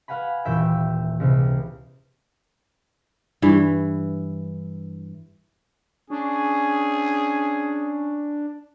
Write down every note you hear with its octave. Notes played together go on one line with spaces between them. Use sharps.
B4 F5 F#5 G#5 B5
D#1 A#2 E3 E5 G5
C#2 C3 B3
G2 E3
C#4 D4 G#4